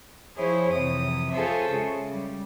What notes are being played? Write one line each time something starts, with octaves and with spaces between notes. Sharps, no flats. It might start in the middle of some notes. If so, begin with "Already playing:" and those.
F3 E4 G#4 C5 C#5
F2 C3 E3 D#6
F4 G#4 A4 C5 C#5 E5
C#3 G#3
G3